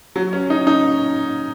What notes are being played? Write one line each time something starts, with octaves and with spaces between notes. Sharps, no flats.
F#3
C#4
D#4
D#4